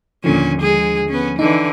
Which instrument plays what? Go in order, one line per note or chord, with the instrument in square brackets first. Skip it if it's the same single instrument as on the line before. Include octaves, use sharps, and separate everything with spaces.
[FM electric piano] D#2 D3 F3 [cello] A#2 C#4
[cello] G#3 G#4
B3 C#4
[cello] D3 E3 [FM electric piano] D#4